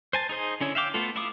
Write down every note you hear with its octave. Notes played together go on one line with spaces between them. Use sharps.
C5 G#5 A5
D#4 G#4 C5 D#5
D3 C#4 E4 C#5
E5 F5 G5 D6
A3 B3 F4 A4
E4 E5 F5 D6 D#6